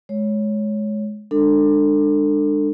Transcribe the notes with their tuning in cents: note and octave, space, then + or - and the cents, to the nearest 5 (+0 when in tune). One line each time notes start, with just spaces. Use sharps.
G#3 +25 C#5 +0
G#3 -35 D4 +20 A4 +30